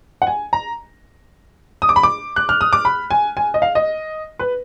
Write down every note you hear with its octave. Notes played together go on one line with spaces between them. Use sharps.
F#5
G#5
A#5
D#6
D6
B5
D6
F#6
F6
D#6
D6
B5
G#5
G#5
D#5
F5
D#5
B4